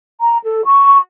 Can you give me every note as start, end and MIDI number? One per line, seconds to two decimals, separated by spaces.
0.20 0.36 82
0.43 0.60 69
0.64 0.97 85